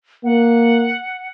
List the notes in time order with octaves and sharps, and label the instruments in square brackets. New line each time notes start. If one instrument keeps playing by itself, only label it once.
[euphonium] A#3 [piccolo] F#5